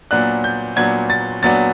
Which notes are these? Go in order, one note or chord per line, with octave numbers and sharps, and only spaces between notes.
A#2 F#3 B3 D4 F#6
G6
A#2 F#3 B3 D4 G#6
A6
A#2 F#3 B3 D4 A6